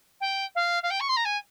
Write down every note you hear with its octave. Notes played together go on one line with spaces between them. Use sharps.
G5
F5
F5
G5
C#6
C6
A#5
G#5